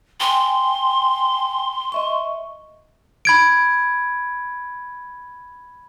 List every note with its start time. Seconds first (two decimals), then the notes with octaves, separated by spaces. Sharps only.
0.20 G5 G#5 C6
1.92 D#5 E5 C#6
3.25 B5 G#6 D7